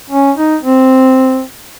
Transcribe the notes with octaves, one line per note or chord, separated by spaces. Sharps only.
C#4
D#4
C4